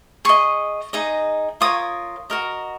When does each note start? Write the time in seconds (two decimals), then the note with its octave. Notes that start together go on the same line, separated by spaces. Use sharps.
0.25 G#4 D#5 C#6
0.93 D#4 G#4 D#5
1.61 F4 A#4 C#5 D#6
2.30 F#4 A#4 D#5